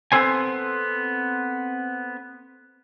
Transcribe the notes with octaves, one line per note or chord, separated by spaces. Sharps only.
B3 C4 A4 C5 G#5